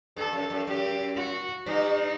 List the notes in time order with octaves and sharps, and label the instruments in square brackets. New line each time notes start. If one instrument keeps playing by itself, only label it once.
[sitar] G2 [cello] A4
[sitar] F#2
F#2
[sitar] F#2 [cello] G4
[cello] F#4
[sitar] G2 [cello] D#4